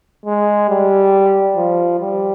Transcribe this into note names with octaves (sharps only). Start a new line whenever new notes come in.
G#3
G3
F3
G3